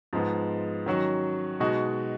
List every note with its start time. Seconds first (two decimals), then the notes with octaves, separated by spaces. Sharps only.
0.13 G#2 F3 G#3 B3
0.86 D#3 F#3 C#4 F#4
1.60 B2 G#3 D#4 F#4